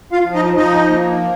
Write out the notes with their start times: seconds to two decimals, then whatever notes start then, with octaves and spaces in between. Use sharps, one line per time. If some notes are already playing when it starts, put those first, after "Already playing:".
0.12 F4 F5
0.23 F3
0.34 D#4 D#5
0.57 F3 D#4 D#5
0.90 A#3